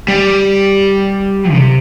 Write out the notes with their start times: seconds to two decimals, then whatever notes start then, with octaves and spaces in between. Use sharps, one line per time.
0.08 G3
1.53 C3